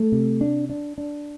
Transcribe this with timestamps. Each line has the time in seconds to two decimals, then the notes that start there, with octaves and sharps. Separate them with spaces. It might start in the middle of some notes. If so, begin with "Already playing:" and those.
Already playing: A3
0.12 C3
0.41 D4
0.70 D4
0.98 D4